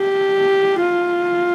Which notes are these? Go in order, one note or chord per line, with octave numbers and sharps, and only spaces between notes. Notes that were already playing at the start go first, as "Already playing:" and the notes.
Already playing: G4
F4